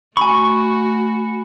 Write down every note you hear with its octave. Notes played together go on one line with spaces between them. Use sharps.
A3 F#4 G#5 B5 C#6